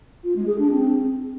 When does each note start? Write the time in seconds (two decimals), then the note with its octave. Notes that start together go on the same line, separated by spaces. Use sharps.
0.23 F4
0.35 G#3
0.47 G#4
0.58 D4
0.70 C4